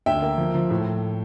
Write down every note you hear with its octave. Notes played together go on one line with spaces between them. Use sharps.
D2 E5 G5
A#3
F3
F3
A2